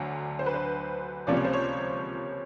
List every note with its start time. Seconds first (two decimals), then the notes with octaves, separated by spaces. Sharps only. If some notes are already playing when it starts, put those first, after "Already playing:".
Already playing: D2 D3 F#3
0.39 C5
0.46 B4
0.54 C5
1.27 C#2 C3 F3 A#3 C#4 D5
1.36 C#5
1.45 C5
1.53 C#5